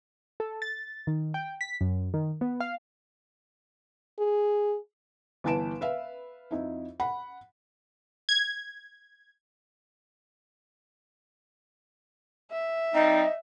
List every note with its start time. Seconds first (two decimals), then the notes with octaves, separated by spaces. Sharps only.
0.40 A4
0.62 A6
1.07 D#3
1.34 G5
1.61 B6
1.81 F#2
2.14 D#3
2.41 B3
2.60 F5
4.19 G#4
5.44 G1 E3 B4 A5 D7 E7
5.81 B4 E5 F5
6.51 F2 D#4 E4
7.00 F#5 B5
8.29 G#6
12.51 E5
12.94 G3 C4 D#4 D#5